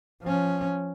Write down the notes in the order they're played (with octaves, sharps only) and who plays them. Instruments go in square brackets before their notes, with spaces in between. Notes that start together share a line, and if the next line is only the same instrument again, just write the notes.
[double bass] F3 C#4